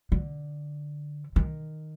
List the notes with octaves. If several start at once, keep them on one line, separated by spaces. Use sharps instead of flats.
D3
D#3